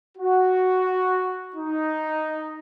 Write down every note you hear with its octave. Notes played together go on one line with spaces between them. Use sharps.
F#4
D#4